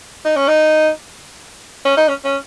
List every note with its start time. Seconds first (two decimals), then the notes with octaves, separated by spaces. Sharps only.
0.25 D#4
0.36 C#4
0.48 D#4
1.85 C#4
1.97 D#4
2.08 C#4
2.24 C#4